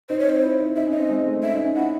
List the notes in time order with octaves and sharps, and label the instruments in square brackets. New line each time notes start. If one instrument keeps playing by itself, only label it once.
[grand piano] D#4 [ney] C5
[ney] C#5
[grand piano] C4 [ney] C5
[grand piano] E4
D#4
[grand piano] D#4 [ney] E5
[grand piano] C#4
[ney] D#5
[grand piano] C4
G#3
A3
[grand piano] C#4 [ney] E5
[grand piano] D#4
C#4
[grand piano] E4 [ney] F#5